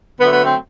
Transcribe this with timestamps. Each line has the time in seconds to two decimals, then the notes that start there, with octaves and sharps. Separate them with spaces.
0.19 D3 F#3 A3 B3
0.32 B3
0.44 C4